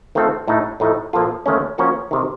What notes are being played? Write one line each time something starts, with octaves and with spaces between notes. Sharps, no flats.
D#3 A3 C4 F4 A4
A2 A3 D#4
A2 F3 A3 D#4
A#2 F3 A#3 F4 A4
D#2 D#3 A3 C#4
F3 A#3 C#4 F#4 A#4
C3 D#3